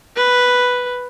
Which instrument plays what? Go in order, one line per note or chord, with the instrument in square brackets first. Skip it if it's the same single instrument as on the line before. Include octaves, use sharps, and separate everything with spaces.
[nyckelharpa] B4